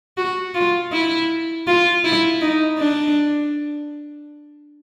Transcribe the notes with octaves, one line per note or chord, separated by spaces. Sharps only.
F#4
F4
E4
F4
E4
D#4
D4